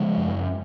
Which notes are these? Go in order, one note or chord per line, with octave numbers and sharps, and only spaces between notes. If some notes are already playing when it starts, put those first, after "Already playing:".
Already playing: C#3 F3 G#3
F#2